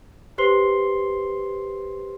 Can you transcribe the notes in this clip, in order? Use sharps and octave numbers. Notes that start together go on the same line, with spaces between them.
G4 B4 C5 C6 C7 G7